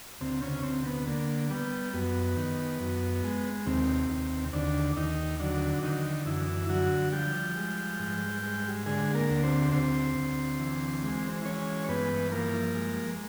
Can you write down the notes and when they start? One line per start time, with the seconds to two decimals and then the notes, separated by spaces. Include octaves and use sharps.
0.20 D2 C3 C4
0.42 C#3 C#4
0.63 D2 C3 C4
0.85 B3
1.07 D3 A#3
1.50 G3 B3
1.94 F#2 B3
2.37 D#3
2.80 F#2
3.24 G#3
3.66 D#2 C3 C4
4.10 D#2
4.53 D#2 D3 D4
4.97 D#2 D#3 D#4
5.40 D3 F#3 D4
5.82 D3 D#3 D#4
6.26 F#2 E3 E4
6.69 D3 F#3 F#4
7.12 F3 G3 G4
7.56 G#3
7.99 G#2
8.42 G#3
8.86 D3 G#3 G#4
9.14 A#3 A#4
9.29 D2
9.43 C4 C5
9.72 D2 C4 C5
10.15 D2
10.59 E3
11.02 G#3
11.45 E3 C#4 C#5
11.89 G2 B3 B4
12.32 F3 A#3 A#4
12.75 G#3